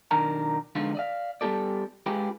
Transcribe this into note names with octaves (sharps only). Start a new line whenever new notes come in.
B1 F#2 D#3 D4 A#4 A#5
D3 F3 G#3 B3 D#4 F4
D5 D#5 F5
G3 B3 D4 G4 A4 D5
G#3 C#4 F4 G4 G#4 B4